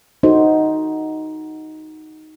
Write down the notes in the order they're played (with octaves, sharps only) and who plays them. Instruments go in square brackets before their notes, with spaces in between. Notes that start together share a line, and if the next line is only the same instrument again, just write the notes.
[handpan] D#4 F#4 A4 C5